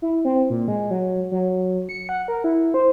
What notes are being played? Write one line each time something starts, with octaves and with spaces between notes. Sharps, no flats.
E4
C4
A#2
G#3
F#3
F#3
C#7
F#5
A#4
E4
C5